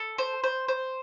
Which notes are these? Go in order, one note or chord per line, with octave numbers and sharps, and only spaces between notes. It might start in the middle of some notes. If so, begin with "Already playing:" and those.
Already playing: A4
C5
C5
C5